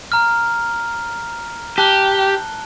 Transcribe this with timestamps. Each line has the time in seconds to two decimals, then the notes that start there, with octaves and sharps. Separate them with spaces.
0.12 A#5 F6
1.78 G4 A5 F#6 G7